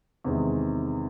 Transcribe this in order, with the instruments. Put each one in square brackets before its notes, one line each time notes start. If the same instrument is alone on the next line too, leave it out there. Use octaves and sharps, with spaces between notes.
[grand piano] E2 C3 D#3 G#3